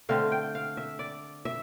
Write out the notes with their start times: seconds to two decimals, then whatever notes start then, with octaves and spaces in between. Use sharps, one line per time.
0.09 D3 A3 C4 F5
0.32 G5
0.55 F5
0.77 E5
0.99 D5
1.45 E5